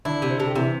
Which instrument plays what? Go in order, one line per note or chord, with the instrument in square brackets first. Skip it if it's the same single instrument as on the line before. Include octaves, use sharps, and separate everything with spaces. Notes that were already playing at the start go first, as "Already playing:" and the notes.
[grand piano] D3 D4 [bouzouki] E4
[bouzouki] C3
[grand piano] C5
[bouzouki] C3 [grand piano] A4
[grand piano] G4
[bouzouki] C3 [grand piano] E3 E4